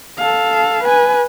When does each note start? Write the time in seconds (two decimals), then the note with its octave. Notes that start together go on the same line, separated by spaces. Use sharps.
0.18 A4 F5
0.84 B4 G#5